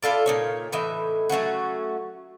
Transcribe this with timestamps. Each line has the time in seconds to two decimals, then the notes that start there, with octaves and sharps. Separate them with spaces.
0.03 E4 F4 A4 D5
0.26 A#2 D#4 C#5
0.72 A2 E3 D#4 E5
1.29 F#3 A3 C#4 F#4